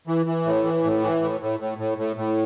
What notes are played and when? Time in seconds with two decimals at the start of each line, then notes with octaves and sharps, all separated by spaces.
0.07 E3
0.26 E3
0.45 A2
0.64 E3
0.84 A2
1.02 E3
1.22 A2
1.41 A2
1.60 A2
1.78 A2
1.98 A2
2.16 A2